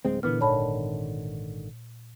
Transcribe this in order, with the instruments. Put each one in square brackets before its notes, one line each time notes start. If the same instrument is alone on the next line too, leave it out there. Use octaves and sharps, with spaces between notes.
[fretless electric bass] D1 G#3 C4
[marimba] A#2 F6 [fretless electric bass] D3 E3 B3
[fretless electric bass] G#1 D3 D#3 [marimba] C#5 A5 B5